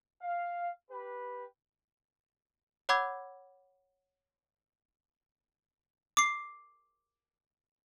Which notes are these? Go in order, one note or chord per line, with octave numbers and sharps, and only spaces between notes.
F5
G4 B4
C#5 F#5 B5 D6 E6 G#6
D6 C7